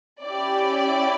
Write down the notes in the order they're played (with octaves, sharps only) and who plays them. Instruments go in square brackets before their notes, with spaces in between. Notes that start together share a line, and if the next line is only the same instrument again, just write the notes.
[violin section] C#4 E4 G4 D5